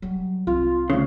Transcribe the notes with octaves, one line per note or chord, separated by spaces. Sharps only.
F#3 G3
C2 F4
D2 C#3